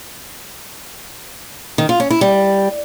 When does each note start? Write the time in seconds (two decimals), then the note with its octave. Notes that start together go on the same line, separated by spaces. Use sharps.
1.78 D#3
1.89 F4
2.00 C#4
2.10 E4
2.21 G3